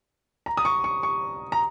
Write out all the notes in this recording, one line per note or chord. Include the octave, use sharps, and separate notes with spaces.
A#5
D#6
C#6
C#6
C#6
A#5